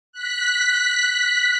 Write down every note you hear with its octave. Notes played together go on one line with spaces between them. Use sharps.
F#6 B6